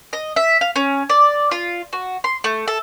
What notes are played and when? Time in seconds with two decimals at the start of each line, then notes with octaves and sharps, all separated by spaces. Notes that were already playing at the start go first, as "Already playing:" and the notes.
0.13 D#5
0.36 E5
0.61 F5
0.76 C#4
1.09 D5
1.51 F4
1.93 F#4
2.24 C6
2.44 A3
2.68 A4